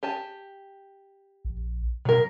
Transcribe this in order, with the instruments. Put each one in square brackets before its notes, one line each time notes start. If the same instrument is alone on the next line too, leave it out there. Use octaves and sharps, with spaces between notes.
[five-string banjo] G4 G#5 A5
[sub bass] A#1
[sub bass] B2 [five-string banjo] F#3 A#4